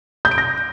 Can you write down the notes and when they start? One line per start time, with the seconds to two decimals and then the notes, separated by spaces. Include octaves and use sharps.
0.25 G6
0.31 D7
0.38 A#6